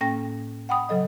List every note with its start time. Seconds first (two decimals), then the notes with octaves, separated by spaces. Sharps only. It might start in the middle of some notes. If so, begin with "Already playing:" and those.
0.01 A2 A#3 C#4 G5 A#6
0.69 F#5 G5 B5 D#6
0.89 C#3 F#3 A4 D#5